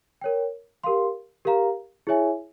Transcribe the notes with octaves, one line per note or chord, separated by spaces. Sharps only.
A#4 C#5 G5
G4 A#4 F5 C6
G4 A#4 F5 A#5
E4 G#4 C#5 E5 G#5